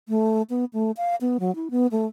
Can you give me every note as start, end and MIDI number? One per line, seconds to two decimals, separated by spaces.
0.09 0.42 57
0.50 0.65 59
0.73 0.91 57
0.97 1.15 77
1.21 1.37 59
1.40 1.54 54
1.56 1.68 64
1.71 1.87 59
1.92 2.06 57